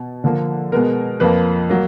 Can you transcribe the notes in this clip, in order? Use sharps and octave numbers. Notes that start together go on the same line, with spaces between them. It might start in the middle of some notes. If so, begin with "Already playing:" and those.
Already playing: B2
D3 F3 A#3
B2 G#3 B3 A#4
F2 F3 A#3 B4
F#3 A#3